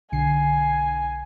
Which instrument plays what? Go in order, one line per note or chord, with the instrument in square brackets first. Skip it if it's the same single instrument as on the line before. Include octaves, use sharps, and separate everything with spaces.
[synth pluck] B1 D3 C7 [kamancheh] G#5